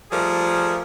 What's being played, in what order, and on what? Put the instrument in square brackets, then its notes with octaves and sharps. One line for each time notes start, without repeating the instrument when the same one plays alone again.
[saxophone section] F3 G3 A3 G#4 A#4